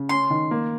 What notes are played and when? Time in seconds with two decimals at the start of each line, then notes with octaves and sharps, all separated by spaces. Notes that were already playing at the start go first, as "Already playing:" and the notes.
Already playing: C#3
0.09 C#4 C6
0.30 D#3
0.51 A#3